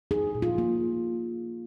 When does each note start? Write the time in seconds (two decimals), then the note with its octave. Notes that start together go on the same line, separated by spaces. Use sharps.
0.11 D#4 G#4
0.35 A#2
0.42 F4
0.58 A#3